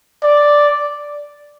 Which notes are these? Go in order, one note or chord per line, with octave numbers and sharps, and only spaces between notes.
D5